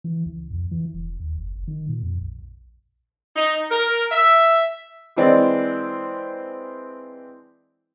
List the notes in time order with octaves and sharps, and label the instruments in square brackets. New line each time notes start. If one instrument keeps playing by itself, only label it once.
[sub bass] E3
C#2
F2
E3
E1
D#2
F#1
F#1
D#3
A#2
F2
A#1
[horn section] D#4
A#4
E5
[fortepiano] E3 G#3 C4 D4 D5